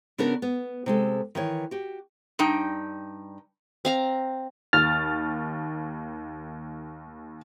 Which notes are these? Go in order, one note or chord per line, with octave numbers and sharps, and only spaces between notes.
C#3 B3 C#4 D4 F#4 A#4
B3
C3 G#3 A4
D#3 E3 C#5
F#4 G4
G2 D#4 G5
C4 F5 A#5
D#2 F6 A6